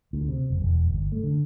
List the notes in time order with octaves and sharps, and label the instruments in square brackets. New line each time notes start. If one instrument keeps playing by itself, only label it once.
[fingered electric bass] D2
C3
F#1
E1
G1
A3
D3